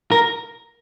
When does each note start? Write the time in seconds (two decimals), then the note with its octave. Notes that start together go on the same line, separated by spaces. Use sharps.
0.12 A#4